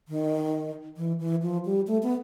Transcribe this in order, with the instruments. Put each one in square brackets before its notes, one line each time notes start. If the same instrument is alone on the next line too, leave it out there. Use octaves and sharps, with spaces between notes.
[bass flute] D#3
E3
E3
F3
G3
A3
B3